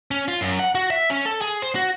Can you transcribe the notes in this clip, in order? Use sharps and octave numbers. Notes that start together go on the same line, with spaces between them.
C#4
F4
F#2
F#5
F#4
E5
C#4
A4
G#4
C5
F#4